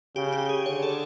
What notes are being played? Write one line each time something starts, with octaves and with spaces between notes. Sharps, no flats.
C#3 G4
G4
G#4
D3 C#5
A4